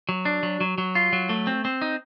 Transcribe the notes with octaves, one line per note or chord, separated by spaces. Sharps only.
F#3
D4
F#3
F#3
F#3
F4
F#3
A3
C4
C4
D#4